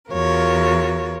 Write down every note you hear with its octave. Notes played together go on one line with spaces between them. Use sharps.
E2 F4 F#4 A#4 C#5